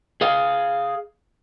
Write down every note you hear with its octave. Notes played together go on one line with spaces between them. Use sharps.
G#4 D#5 F5